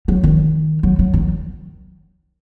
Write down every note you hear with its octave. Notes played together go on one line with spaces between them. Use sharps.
F#3
D#3
F#3
F#3
D#3